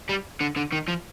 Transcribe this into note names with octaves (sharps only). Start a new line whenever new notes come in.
G3
D3
D3
D#3
F3